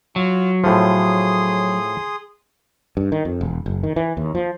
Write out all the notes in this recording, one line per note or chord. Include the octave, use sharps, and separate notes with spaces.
F#3 F4
A2 F3 G#4 C6 D#6
G2
D#3
F2
E1
F#1
D#3
E3
D#2
F3